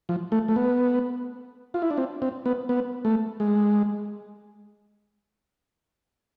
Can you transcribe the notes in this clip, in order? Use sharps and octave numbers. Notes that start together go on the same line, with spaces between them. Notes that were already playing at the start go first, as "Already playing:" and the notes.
F3
A3
A3
B3
F4
E4
D4
C4
C4
B3
B3
A3
G#3